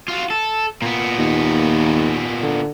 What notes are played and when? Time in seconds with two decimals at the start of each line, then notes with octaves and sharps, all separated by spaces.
0.08 F4 F#4
0.30 A4
0.82 A#2 B3
1.18 D#2
2.43 D3